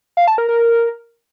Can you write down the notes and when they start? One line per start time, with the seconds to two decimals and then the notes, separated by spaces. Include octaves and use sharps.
0.17 F5
0.28 A5
0.38 A#4
0.49 A#4